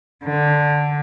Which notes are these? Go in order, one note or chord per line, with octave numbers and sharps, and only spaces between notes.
D3